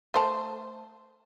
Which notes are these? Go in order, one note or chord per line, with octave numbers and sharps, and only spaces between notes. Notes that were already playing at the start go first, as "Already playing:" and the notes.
A3 C5 A5